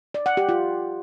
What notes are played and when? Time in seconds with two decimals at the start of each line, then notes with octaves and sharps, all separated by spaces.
0.14 D5
0.26 F#5
0.37 G4
0.49 F4